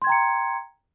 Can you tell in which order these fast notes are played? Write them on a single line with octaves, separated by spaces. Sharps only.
C6 G#6 G5 A#5 C#7